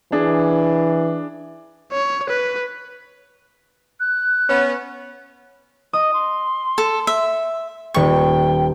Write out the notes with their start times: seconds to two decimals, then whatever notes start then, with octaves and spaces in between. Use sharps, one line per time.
0.12 E3 D4 G#4
1.92 C#5
2.29 B4
4.00 F#6
4.49 B3 C#4
5.93 D#5 D#6
6.14 C6
6.78 A4
7.07 E5
7.94 D#1 G5 C#6 C#7